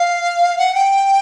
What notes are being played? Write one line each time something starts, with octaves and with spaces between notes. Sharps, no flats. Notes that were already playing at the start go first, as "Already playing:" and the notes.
Already playing: F5
F#5
G5